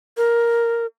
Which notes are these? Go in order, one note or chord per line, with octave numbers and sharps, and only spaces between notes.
A#4